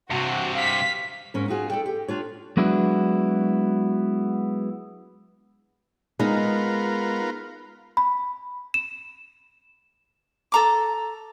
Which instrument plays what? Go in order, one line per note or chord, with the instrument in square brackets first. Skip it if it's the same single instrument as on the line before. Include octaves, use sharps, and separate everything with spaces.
[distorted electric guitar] G2 C3 [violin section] F#4
[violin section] F5 B6
[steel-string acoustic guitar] G#2 C#4 A#4
D#4 F4 F#4 G#4
A4 D5 G5
G4
D4 F4 C#5
[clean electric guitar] F#3 G#3 B3 D4 E4 F#4
[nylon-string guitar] G#3 D#4 [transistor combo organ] B3 F4 A#4
[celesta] B5
E7
[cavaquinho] A4 A#5 D6